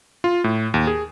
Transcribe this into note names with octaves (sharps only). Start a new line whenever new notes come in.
F4
A2
D#2
G#4